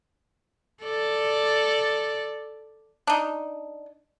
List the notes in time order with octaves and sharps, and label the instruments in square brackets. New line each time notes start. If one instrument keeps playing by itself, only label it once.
[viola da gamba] A4 D5
[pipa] D4 D#4